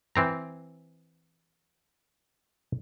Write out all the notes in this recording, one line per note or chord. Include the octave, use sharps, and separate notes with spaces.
E3 C4 A#5